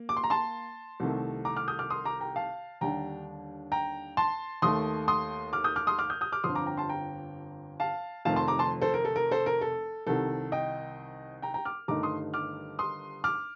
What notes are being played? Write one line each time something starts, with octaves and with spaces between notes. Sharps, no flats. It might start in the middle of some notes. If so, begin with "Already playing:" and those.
Already playing: A#3
D6
C6
A#5
A5 C6
C2 C3 D#3 A3
A#5 D6
D6 F6
D#6 G6
D6 F6
C6 D#6
A#5 D6
G5 A#5
F5 A5
D#2 D3 G3 D4 G5 A#5
G5 A#5
A5 C6
D#2 D#3 A3 C6 D#6
C6 D#6
D6 F6
D#6 G6
D6 F6
C6 D#6
D6 F6
D#6 G6
D#6 G6
D6 F6
G1 F2 D3 C6 D#6
A#5 D6
G5 A#5
A5 C6
G5 A#5
F5 A5
F1 F2 D#3 A3 F5 A5
A5 C6
A#5 D6
A5 C6
A4 C5
A#4
A4
A#4
A4 C5
A#4
A4
C2 C3 D#3 A4
D#5 G5
G5 A#5
G5 A#5
D6 F6
G1 G2 D#3 A3 D#4 A#5 D6
C6 D#6
D6 F6
C6 D#6
D6 F6